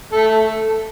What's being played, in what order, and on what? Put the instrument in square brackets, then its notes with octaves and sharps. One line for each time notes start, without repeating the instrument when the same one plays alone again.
[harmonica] A3 A4